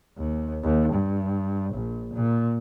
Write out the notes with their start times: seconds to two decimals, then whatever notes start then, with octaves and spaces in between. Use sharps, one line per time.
0.18 D#2
0.64 D#2
0.93 G2
1.74 A#1
2.14 A#2